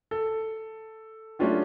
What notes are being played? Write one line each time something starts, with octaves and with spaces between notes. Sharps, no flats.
A4
F#3 A3 C#4 D4 F4 G4